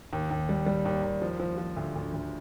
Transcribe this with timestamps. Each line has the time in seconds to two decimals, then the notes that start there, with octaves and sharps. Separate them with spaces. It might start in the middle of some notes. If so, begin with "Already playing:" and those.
0.13 D#2
0.31 D#2
0.49 G3
0.66 G3
0.85 D#2
1.03 D#2
1.22 F3
1.39 F3
1.58 F3
1.77 D2
1.96 D2
2.14 D2